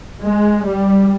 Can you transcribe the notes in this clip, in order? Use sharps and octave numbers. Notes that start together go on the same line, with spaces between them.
G#3
G3